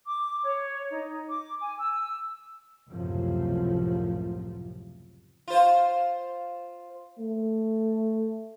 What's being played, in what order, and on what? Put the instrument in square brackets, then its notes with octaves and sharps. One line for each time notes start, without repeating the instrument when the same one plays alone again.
[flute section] D6
C#5
D#4
D6
G#5
E6
[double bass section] C#2 F#2 A2 C3 F3
[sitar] F4 C5
[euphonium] A3